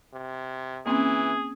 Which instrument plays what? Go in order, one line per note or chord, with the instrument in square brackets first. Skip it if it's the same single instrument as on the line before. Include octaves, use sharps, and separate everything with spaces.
[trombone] C3
[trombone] E3 [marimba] A#3 C4 C#4 [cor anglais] G#4